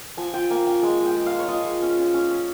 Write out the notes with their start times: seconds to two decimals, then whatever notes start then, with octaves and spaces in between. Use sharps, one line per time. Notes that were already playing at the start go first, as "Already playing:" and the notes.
0.17 F3 G#5
0.33 F4 G5
0.50 A#3 G#5
0.66 C#4 G5
0.82 G#3 G#5
1.00 G#3
1.06 G5
1.16 G#3
1.26 F5
1.32 G#3
1.39 C#5
1.48 F4 D#5
1.65 G#3
1.82 C#4
1.98 C#4
2.14 C#4
2.31 C#4